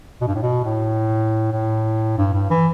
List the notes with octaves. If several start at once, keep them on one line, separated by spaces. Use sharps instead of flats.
B2
G2
A2
B2
A2
A2
G2
G2
E3